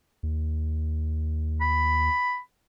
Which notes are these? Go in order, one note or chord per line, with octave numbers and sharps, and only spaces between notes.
D#2
B5